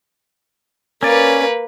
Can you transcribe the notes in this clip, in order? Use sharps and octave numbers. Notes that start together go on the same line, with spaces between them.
A#3 C#4 B4 D5